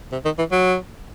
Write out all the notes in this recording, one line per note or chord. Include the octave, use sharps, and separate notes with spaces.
C3
D#3
E3
F#3